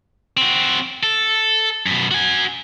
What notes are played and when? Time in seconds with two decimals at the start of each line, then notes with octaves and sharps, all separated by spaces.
0.37 C4 F#4
1.03 A4
1.86 F#2 B2
2.11 F#4 G#5